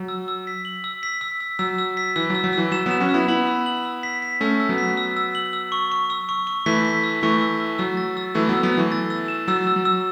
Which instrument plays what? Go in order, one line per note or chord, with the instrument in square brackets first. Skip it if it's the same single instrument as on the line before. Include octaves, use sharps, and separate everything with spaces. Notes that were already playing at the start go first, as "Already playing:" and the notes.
Already playing: [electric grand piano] F#3
[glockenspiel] E6
E6
B6
F#7
E6
B6
E6
E6
[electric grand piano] F#3 [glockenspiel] E6
[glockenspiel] E6
B6
[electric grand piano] E3 [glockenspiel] E6
[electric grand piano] F#3
[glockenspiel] E6
[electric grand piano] F#3
[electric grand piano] E3 [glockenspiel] E6
[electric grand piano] F#3 [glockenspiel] E7
[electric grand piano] F#3 B3 [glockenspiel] E7
[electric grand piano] C#4 F#4
[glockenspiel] E6
[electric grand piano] B3 E4
[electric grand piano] B3 E4 [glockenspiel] F#7
[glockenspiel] E6
F#7
E6
B6
B6
[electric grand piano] A3 C#4 [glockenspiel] E6
[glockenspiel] E6
[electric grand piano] F#3 B3
[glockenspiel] B6
E6
E6
F#7
E6
C#6
C#6
E6
C#6
C#6
[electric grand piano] E3 A3 [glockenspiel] B6
[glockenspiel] B6
E6
[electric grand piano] E3 A3 [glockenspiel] C#6
[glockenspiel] E6
C#6
[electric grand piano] F#3 [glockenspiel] E6
[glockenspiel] A6
E6
[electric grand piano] E3 A3 [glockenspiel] E6
[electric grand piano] F#3 B3 [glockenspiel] E6
[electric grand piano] F#3 B3
[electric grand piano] E3 A3 [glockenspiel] E6
[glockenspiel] A6
E6
E7
[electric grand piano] F#3 [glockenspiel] E6
[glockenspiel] E6
[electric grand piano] F#3
[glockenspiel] E6